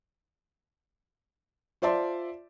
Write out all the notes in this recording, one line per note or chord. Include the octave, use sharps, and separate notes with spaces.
F4 C5 D5 E5 A5 C6